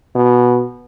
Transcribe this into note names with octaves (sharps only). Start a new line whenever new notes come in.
B2